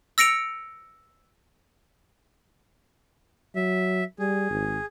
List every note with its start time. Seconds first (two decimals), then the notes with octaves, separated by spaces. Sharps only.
0.18 E6 A#6 C#7 D7 F7
3.55 F#3 E5
4.19 G3 G#4
4.50 G#1